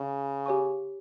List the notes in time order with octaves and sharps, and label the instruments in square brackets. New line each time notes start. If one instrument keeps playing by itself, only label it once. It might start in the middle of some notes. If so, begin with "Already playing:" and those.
Already playing: [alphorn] C#3
[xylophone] G4 C#5 G#5 C#6